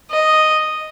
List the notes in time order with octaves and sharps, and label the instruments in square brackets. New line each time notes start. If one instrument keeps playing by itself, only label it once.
[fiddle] D#5